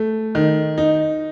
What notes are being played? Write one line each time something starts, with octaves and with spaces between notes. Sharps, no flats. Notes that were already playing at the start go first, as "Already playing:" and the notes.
Already playing: A3
D#3
D#4